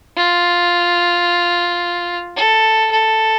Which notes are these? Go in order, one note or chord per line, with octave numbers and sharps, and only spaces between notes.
F4
A4
A4